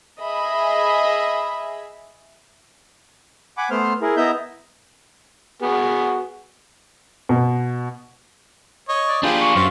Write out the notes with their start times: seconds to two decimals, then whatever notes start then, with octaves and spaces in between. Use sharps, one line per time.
0.21 G#4 D#5 E5 B5
3.57 F#5 G#5 B5 D6
3.70 A3 B3 C5 C6 F6
4.01 E4 G#4 A#4
4.17 B3 E4 D#5 E5 A#5 G6
5.62 B3 F#4 G#4
7.29 B2
8.89 C#5 D#5
9.08 D5
9.23 D4 F4 G4 G#4 B4 C5
9.41 C#6
9.55 F#2 F4 C5 F5